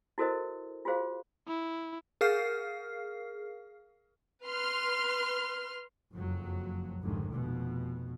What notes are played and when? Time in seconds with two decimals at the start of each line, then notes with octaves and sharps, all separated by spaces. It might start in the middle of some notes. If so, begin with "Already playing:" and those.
0.18 E4 F#4 A4 A#4 C5 D#5
0.85 F4 F#4 G#4 C5 F5
1.47 E4
2.21 G#4 A#4 F5 F6 C7
4.45 B4 C6 F6
6.10 F#1 F2 F#3
7.02 F1 C#2 G#2 D3 D#3
7.31 F1 B2